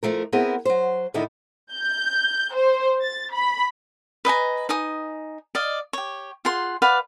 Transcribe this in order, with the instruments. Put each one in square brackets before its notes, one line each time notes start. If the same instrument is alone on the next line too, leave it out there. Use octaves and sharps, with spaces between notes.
[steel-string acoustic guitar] F2 F3 A3 A#4
B3 C4 E4 G#4 A#4
F#3 C5
A2 D3 D#3 D#4 E4
[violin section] G6
C5
A6
B5
[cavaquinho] B4 D#5 G#5 A#5
D#4 G#5 D#6
D5 D#5 F5
G4 C#5
F4 G#4 F#5 C6
B4 D5 F5 F#5